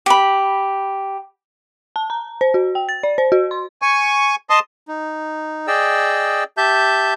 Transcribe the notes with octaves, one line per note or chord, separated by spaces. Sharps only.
G4 B5
A5
A#5
C5
F#4
G5
A6
D5
C5
F#4
C6
G#5 C#6
D#5 A5 C6 D#6
D#4
G#4 D5 D#5 G5 E6
G4 E5 A5 G6